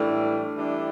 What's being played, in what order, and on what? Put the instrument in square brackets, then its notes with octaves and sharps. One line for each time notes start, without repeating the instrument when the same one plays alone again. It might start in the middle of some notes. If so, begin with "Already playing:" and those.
Already playing: [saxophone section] A2 E3 G3 D4 [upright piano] A3
[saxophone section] E3 G3 D4